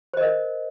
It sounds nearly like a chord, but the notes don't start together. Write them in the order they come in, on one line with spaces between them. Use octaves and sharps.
C5 D#5 A#4